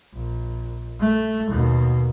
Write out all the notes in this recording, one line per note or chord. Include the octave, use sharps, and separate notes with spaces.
A#1
A3
D#2 B2